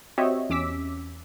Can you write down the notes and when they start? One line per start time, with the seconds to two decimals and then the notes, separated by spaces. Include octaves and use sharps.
0.18 C4 F#4 G4 C#5 D#5 E5
0.50 E2 C#4 D6 E6 B6